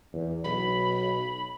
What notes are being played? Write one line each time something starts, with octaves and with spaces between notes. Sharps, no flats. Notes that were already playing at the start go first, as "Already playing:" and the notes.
E2
B1 B5